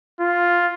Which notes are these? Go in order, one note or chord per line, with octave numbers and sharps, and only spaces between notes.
F4